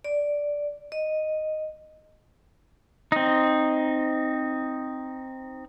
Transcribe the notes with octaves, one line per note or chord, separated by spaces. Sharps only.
D5
D#5
C4 D#4